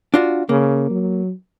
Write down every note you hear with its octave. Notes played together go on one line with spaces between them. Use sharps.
D4 F4 F#4
C#3 A#3
F#3